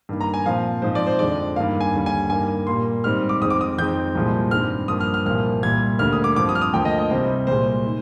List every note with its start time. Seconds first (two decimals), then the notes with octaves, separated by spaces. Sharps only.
0.09 G2 D#3 A#3
0.21 A#5
0.34 G#5
0.46 A#2 F3 C4 F5
0.82 G#2 F3 C4 C5
0.95 D5
1.07 C5
1.19 F2 D3 F3 G#3 D5
1.56 G2 D#3 A#3 F5
1.81 G#5
1.94 D#2 D3 G3
2.06 G#5
2.30 G2 D#3 A#3 G#5
2.67 A#2 G3 A#3 C6
3.04 G#2 D#3 G3 C4 F6
3.29 D6
3.41 F2 D#3 G#3 C4 D#6
3.50 D6
3.61 D#6
3.78 F2 D#3 G#3 C4 G6
4.15 C2 A#2 F3 G#3
4.51 G2 D#3 G#3 C4 F6
4.88 G2 F3 A#3 D#6
5.01 F6
5.14 F6
5.26 C2 A#2 F3 A#3 F6
5.63 C2 A#2 G3 A#3 G#6
5.99 D2 D3 G3 A#3 F6
6.12 D#6
6.24 D6
6.36 G2 F3 C4 D6
6.49 D#6
6.55 F6
6.61 D#6
6.74 D2 D3 F3 A#3 G5
6.85 D#5
6.99 D#5
7.10 C2 C3 G3 C5
7.47 C2 A#2 G#3 C5
7.86 D#3